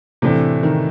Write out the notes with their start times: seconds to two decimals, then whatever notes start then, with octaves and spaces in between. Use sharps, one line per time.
0.22 A2 C3 E3 A3 D4
0.63 D#3